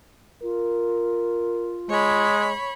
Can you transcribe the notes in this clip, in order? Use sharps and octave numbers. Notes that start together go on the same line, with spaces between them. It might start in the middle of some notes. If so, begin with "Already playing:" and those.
F4 A#4
G#3 C#5 B5